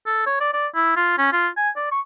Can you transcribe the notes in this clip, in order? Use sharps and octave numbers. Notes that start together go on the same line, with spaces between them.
A4
C#5
D5
D5
E4
F4
C#4
F4
G#5
D5
C#6